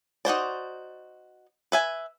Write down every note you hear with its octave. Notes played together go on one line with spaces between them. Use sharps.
D#4 F#4 C5 D5
B4 E5 G#5